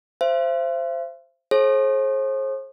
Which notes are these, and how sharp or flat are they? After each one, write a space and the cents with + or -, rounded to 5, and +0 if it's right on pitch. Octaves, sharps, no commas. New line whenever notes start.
C5 +0 E5 +45
G#4 +45 C5 +45